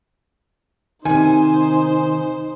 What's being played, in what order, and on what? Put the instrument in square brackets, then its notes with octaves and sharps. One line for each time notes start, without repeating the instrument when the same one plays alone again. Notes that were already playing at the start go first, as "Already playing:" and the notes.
[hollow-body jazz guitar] C3 D#3 [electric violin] D#4 C5 [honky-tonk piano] G#5